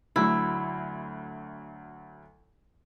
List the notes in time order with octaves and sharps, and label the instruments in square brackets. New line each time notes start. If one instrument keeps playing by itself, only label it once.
[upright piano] D2 F#3 [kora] E4